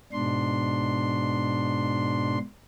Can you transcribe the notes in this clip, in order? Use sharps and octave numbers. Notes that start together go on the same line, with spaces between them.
G#2 B2 D4 C6